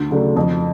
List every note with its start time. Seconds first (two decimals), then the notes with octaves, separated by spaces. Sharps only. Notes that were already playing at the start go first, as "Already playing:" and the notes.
Already playing: D2
0.11 C#3 F#3 A3 D4
0.36 F2